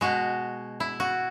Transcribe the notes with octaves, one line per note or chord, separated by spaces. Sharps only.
B2 G#3 F#4
E4
F#4